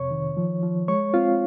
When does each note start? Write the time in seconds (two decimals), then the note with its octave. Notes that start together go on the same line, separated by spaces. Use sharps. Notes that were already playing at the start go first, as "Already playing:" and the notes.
Already playing: F2 C3 C#5 C#6
0.11 D#3
0.37 F3
0.62 F3
0.88 G#3 C#5 C#6
1.14 C4 F4 F5